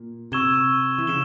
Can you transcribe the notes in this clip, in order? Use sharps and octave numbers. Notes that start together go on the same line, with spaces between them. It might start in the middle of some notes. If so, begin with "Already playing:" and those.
Already playing: A#2
C3 C#6 E6 G#6 E7 G7
E3
C#3 E7 G7